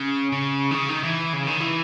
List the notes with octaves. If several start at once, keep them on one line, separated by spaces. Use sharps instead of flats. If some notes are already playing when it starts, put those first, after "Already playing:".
Already playing: C#3
C#3
D#3
C#3
D#3
E3
C#3
D#3
E3